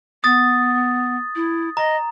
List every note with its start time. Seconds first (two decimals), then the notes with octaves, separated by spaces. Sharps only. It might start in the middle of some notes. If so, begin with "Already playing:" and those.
0.24 B3 D#6 A6
1.36 E4
1.77 D#5 A#5